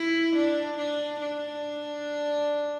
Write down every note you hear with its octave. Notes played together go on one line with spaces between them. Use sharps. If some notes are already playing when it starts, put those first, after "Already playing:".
Already playing: E4
D4
D4
D4